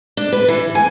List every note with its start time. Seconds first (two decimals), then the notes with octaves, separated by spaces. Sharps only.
0.17 D4
0.32 B4
0.48 E3
0.75 G#5